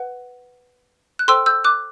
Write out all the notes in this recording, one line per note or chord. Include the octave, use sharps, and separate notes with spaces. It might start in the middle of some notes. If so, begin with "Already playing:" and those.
Already playing: B4 F#5
F#6
A4 C5 G5 C6 E6
E6 G6
D6 F#6